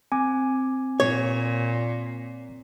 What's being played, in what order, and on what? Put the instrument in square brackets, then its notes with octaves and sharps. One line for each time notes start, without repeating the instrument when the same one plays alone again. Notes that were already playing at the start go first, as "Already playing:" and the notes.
[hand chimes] C4 [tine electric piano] G#5 D6
[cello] A#2 [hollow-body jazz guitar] C#5